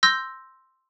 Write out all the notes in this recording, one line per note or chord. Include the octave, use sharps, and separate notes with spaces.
C6 E6 G6 A#6